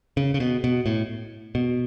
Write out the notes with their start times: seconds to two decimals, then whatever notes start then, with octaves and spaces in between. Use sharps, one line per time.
0.17 C#3
0.34 C#3
0.40 B2
0.64 B2
0.86 A2
1.55 B2